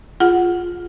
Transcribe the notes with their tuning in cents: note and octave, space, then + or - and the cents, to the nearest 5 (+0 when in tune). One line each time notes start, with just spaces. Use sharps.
F4 +0 G#4 +0 F#5 +0